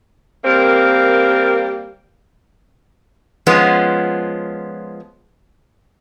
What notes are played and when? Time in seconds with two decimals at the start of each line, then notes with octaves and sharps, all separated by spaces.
0.44 G3 A#3 C4 A#4
3.47 F3 G#3 B3 C#4